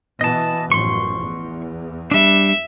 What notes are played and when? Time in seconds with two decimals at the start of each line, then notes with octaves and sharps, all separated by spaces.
0.21 B2 E3 B3 D#5 A5
0.72 A1 F#2 F3 C6 C#6
1.21 E2
2.11 G3 D4 E5